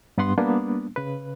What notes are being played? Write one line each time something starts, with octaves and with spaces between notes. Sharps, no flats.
G2 B3 B4 F#5 C6
G3 A#3 B3 D4
C#3 B4